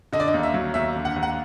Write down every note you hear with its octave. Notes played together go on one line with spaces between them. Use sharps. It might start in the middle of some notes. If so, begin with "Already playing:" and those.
D3 D#5
D5
D#5
D#2
E5
F#3
D#2 E5
D3
F#5
D#2
F#5